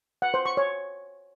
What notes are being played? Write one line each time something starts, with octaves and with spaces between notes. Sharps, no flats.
F#5
C5
C#6
C#5